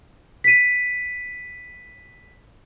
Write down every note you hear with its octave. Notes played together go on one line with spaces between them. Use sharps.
B6 D#7